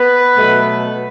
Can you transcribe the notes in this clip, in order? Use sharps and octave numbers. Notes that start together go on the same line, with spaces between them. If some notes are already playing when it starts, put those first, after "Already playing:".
Already playing: B3 B4
B2 F#3 A3